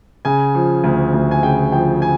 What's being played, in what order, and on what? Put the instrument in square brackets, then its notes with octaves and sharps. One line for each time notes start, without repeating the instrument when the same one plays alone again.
[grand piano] C#3 G#5
F3
D2
D2
G#5
C#3 G5
F3 G5
G#5